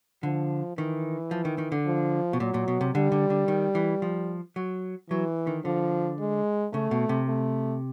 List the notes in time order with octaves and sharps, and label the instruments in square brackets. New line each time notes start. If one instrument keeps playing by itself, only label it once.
[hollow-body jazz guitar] D3 [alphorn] F3
[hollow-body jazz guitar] D#3 [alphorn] E3
[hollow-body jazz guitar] F3
D#3
D#3
D3
[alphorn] F3
[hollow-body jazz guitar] B2
[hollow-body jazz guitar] A#2 [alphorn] F#3
[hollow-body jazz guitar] A#2
B2
C3
[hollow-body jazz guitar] D3 [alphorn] G3
[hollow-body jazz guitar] D3
D3
D#3
E3
F3
F#3
[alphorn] E3 [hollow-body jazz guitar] F#3
[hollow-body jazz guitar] D#3
[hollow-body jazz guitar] D3 [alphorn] F3
[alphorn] G#3
[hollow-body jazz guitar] C#3 [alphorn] A3
[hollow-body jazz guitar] B2
C3
[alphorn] A3